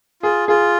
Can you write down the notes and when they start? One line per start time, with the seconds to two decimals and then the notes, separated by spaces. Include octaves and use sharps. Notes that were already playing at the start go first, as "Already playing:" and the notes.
0.23 F4 G#4
0.48 F4 G#4